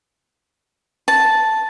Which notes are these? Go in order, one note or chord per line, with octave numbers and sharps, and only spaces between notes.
A5